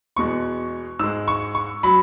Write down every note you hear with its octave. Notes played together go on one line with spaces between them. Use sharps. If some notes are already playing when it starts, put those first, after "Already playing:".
E2 B2 G#3 C#6
G#2 G#3 E6
C#6
C#6
F#3 B5